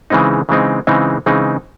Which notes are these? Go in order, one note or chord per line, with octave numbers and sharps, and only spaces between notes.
C#3 E3 G#3 C4 D#4
C#3 E3 G#3 C4 D#4
C#3 E3 G#3 C4 D#4
C#3 E3 G#3 C4 D#4